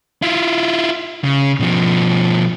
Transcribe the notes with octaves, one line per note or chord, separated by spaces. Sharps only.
E4 F4
C#3
B2 F3